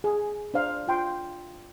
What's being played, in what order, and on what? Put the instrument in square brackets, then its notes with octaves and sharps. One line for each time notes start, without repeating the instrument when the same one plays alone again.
[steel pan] G#4
D4 C5 F5
F4 G5 C6